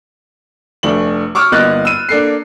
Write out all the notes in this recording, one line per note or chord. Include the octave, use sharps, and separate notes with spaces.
F1 A3 D4 F#7
C#6 D6 E6 F6
G1 A#3 D#5 F#6 A6
E6 D#7
A#3 D4 A4 C7